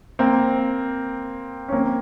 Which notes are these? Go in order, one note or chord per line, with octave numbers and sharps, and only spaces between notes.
A#3 C4
C#4
A#3 C4